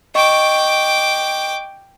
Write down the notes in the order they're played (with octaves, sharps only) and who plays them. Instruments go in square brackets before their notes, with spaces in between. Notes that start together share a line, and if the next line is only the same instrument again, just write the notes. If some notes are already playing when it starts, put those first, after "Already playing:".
[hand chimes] D#5 C#6 [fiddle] G5 D6